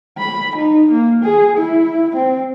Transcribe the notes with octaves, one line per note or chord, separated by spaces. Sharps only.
B5
D#4
A#3
G#4
E4
C4